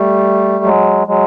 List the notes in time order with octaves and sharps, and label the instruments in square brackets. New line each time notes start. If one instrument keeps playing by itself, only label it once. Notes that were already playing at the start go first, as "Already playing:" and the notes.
Already playing: [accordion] G3 A3
F#3 G#3
F#3 G#3